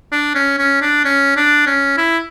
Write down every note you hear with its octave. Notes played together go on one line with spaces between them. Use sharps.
D4
C#4
C#4
D4
C#4
D4
C#4
E4